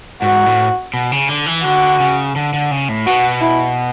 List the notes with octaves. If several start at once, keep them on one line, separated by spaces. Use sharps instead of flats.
G#2 F#4
A2
B2
C#3
D3
E3
D3 F#4
C#3
D3
D3
C#3
A2
B2 F#4
E4